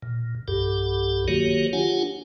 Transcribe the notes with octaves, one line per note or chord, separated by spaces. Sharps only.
A#2
B1 G2 G4 A4
D#3 F#3 A#3 F#4 G4 C#5
D4 F4 G4 F#5 G#5